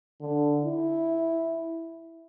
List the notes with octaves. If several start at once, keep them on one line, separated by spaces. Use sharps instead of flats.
D3
E4